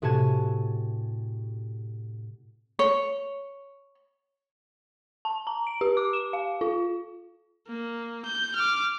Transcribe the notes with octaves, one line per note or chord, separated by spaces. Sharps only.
A2 C3 F#4 G#5 A5 G#6
C#5
A5
A#5
D7
G4
D6
E7
F5
F4
A#3
G6
D6 F6